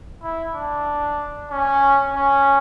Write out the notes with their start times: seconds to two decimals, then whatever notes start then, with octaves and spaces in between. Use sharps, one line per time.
0.23 E4
0.55 D4
1.51 C#4
2.14 C#4